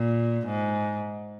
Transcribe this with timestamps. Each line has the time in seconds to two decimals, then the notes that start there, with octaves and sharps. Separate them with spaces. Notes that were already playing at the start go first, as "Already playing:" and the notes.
Already playing: A#2
0.46 G#2